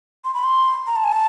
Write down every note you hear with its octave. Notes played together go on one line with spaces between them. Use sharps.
C6
B5
C6
A#5
A5
G#5
A5